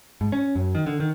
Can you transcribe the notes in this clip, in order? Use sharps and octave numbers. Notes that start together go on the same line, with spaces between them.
G#2
C#4
F#2
D#3
D3
D#3